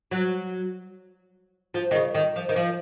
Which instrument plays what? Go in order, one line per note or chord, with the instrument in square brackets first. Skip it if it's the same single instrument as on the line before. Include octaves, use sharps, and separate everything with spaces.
[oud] F#3
F3
D#3
C#3
D#3
F3
D#3
F3